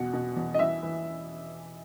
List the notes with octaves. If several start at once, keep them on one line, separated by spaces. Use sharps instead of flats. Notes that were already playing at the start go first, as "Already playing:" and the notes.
Already playing: E2 B2 F#5
B2
E2
D#5
E3 E5
E3